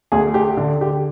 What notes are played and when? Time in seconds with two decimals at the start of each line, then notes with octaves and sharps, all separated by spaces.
0.12 D2 G#4
0.34 G4
0.57 D3
0.81 G4